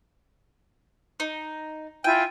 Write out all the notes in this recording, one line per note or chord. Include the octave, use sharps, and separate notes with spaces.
D#4
E4 F4 G5 G#5